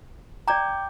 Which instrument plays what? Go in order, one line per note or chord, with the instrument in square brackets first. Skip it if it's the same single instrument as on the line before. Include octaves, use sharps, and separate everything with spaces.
[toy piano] D5 A#5 [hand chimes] G5 D6 G6